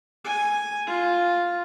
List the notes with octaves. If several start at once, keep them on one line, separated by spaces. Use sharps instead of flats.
G#5
F4